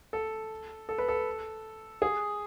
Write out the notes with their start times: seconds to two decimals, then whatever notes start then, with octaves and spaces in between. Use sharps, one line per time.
0.13 A4
0.89 A4
0.98 B4
1.08 A4
2.02 G#4